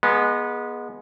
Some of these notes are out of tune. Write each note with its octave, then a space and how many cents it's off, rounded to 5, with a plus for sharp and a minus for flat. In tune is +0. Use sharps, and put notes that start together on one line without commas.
G#3 +0 B3 -25